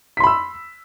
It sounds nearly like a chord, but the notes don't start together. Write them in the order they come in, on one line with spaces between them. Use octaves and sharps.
B6 C6 B5 E6